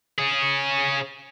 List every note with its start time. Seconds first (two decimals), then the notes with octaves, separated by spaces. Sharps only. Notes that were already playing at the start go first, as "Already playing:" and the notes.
0.18 C#4 G#4